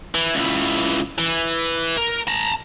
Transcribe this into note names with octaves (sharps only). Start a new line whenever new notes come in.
E3
C#2 E3
E3
A#4
A5 A#5